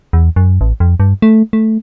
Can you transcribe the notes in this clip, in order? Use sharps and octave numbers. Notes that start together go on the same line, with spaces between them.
E2
F#2
A1
F2
G2
A3
A3